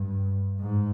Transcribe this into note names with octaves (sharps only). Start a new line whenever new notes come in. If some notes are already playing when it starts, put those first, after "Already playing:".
Already playing: G2
G#2